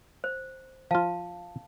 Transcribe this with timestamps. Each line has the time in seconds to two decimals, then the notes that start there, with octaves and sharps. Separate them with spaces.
0.24 C5
0.91 F3 F4 F5 A5